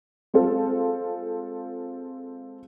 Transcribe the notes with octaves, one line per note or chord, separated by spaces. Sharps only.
G#3 C4 F4 A4